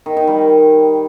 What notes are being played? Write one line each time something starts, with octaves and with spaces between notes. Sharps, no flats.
D#3
D#3
G3